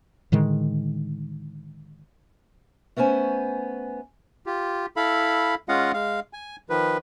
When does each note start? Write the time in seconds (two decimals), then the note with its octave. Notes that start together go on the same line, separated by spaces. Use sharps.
0.32 A2 D3 D#3 G#3
2.97 A3 B3 C#4 C5 G#5
4.46 F4 G4
4.96 E4 A4 F5 B5
5.69 G#3 C#4 F4 D#5 F5 F#5
5.94 G#3 F5
6.33 G#5
6.69 D#3 F3 B4